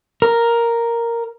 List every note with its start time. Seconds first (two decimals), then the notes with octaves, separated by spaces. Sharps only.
0.22 A#4